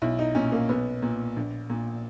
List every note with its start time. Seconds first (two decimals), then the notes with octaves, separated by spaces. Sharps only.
0.02 B1 E4
0.19 D#4
0.35 A#2 C#4
0.52 A#3
0.69 B1 B3
1.02 A#2
1.36 A#1
1.70 A#2